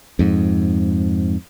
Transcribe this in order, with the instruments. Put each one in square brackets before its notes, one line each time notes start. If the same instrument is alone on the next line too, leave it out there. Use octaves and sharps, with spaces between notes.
[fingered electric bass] F2 G#2